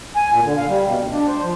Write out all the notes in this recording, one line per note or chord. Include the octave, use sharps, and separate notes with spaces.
G#5
A#2
D3
F5
G3
B2
D2
D4
C5
F3